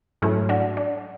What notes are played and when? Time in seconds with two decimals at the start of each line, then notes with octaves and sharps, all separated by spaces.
0.22 G#2 F#3 A3 C#4 E4
0.49 D4 F#4
0.77 D4